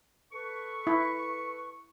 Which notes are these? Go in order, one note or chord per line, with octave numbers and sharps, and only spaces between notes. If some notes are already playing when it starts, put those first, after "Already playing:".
A4 B4 C#6
E4